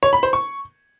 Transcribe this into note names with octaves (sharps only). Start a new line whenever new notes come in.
C#5
B5
C5
C#6